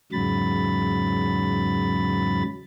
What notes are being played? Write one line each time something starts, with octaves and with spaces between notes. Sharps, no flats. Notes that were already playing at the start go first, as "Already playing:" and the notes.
E2 G#2 C#3 F#3 B5 A6